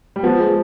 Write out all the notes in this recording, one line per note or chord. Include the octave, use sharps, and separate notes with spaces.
G3
F3 B3
G#3